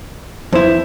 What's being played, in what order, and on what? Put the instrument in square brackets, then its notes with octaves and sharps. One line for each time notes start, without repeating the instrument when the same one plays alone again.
[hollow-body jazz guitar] F2 E4 [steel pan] B4 C5